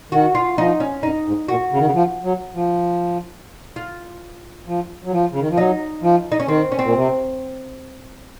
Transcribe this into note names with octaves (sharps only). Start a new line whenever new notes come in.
D#3 F#4
F4
F3 D#4
C#4
F#2 D#4
G#2
A#2 F#4
C#3
D#3
C#3
F3
F#3
F3
F4
F3
F#3
F3
C#3
D#3
F3
F#3 D#4
F3
D#4
C#4
D#3 C4
C#4
A#2 C4
C3